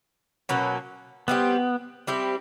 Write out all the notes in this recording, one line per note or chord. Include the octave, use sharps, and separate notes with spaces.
B2 F#3 A#3 C#4
G3 B3 C4 E4 G4
G3 C4 E4 G4